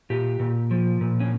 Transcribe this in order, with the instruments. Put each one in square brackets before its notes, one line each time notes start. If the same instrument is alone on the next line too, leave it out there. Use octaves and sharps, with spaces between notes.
[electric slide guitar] A#2 G4
A#2
F3
A#2
C#4